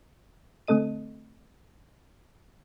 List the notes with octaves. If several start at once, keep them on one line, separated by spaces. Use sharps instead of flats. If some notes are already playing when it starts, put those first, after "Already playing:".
D3 A3 C4 A4 D#5 D#7